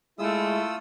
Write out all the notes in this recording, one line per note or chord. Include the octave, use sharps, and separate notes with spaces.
G#3 A3 E4 F4 D#6 E6